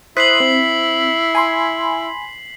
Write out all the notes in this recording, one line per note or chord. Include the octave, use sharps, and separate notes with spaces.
E4 C5 D#6 F#6 B6 C7 F#7
C4
G#5 B5 C6